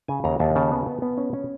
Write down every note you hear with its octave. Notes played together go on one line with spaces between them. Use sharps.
C#3 G#5
D#2 A#5
D#2 A5
C#3 A5
B3
B3
B3
C#4
C#4